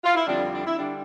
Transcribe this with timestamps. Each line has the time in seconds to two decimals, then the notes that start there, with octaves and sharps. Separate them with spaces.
0.04 F4
0.15 E4
0.27 F2 D3 G3 D4
0.53 D4
0.66 E4
0.79 D3 G3 D4